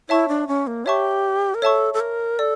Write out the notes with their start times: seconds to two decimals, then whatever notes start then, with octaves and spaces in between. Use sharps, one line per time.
0.09 E4 C#5 E5 A5 C#6
0.28 D4
0.48 C#4
0.67 A#3
0.86 G4 C#5 E5 A5 C#6
1.54 A#4
1.62 A4 C#5 E5 A5 C#6
1.94 A4
2.00 A#4
2.39 A4 D5